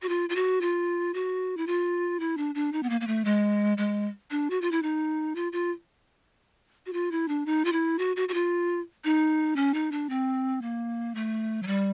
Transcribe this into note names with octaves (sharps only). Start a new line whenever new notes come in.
F#4
F4
F4
F#4
F4
F#4
E4
F4
E4
D4
D4
D#4
B3
A#3
A#3
A3
G#3
G#3
D4
F#4
F4
E4
D#4
F4
F4
F#4
F4
E4
D4
D#4
F4
E4
F#4
F#4
F#4
F4
D#4
C#4
D#4
D4
C4
A#3
A3
F#3
G3